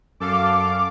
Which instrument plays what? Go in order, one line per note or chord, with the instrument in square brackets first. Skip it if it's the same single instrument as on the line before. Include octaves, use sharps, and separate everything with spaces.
[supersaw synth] F#2 A4 F5 [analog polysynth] D6